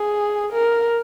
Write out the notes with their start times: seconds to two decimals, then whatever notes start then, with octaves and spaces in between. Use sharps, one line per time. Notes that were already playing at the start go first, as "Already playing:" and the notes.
Already playing: G#4
0.53 A#4